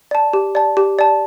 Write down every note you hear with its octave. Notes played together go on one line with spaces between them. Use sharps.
D5 A5
G4
D5 A5
G4
D5 A5